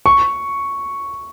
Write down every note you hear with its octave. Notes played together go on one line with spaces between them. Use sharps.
C#6